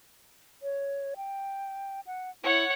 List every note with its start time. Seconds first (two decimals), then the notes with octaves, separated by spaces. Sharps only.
0.63 C#5
1.17 G5
2.06 F#5
2.44 E4 C#5 F#5